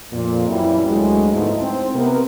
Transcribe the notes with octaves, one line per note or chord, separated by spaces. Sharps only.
F2 A#2
F#2 E3 F#3 G3 A#3 E4
D2 F#3 G#3
G#2 F3 A3 B3 D#4 E4
C4 C5
C3 B3 A#4